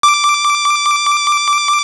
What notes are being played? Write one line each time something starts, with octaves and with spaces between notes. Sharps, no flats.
D6